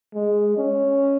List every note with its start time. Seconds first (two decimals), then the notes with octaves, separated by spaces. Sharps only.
0.14 G#3
0.58 C#4